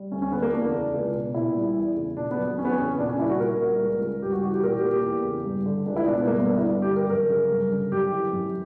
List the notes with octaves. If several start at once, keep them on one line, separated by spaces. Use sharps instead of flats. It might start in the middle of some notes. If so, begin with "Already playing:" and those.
Already playing: G3
D2 C#4
C#4
D3 B3
A#3
E2 D4
C#3
C#2
B2
A#2 E4
G3
E2
C#3
A#2 D4
B3
F#3
E2 C#4
B3
C#4
C#3
A#2 D4
C#4
G3 E4
F#4
A#2 A#4
G3
C#2
C#3
G2 G4
F#4
E3 F#4
G4
A#2 A#4
G4
A#3
G4
E2
C#3
G2
D3
C#2 D4
E4
B2 D4
B3
G2 A#3
B3
D3 D4
E4
G2
G4
D3
A#4
F#2 A#4
C#3
G2
D3
F#2 G4
E3
F#2